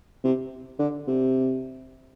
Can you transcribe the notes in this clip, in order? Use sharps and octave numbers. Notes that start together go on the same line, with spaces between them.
C3
D3
C3